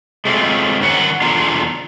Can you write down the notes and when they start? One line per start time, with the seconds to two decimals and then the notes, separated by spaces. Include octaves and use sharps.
0.25 G#3 A3 C4 E4 F4
0.81 G#2 D#3 C#4 A#4 F#5
1.22 E2 D3 D4 F4 A#5